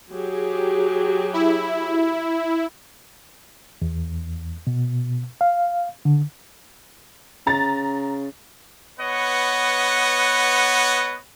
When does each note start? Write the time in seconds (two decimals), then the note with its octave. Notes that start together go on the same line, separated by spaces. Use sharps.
0.11 F#3 G4 G#4
1.33 E4
3.82 E2
4.67 B2
5.41 F5
6.05 D3
7.47 C#3 A#5 A6
9.00 B3 B4 C#5 D#5 F#5